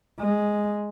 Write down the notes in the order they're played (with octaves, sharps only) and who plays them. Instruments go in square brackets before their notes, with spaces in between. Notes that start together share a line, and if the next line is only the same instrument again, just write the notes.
[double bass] G#3